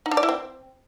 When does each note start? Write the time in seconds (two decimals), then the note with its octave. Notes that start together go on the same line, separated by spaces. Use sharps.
0.06 D#4
0.11 D4
0.17 D5
0.23 E4
0.29 C4